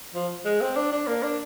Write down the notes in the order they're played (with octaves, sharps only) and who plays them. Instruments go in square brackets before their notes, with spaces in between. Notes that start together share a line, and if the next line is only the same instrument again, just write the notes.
[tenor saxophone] F3
G#3
C4
D4
D4
A#3
D4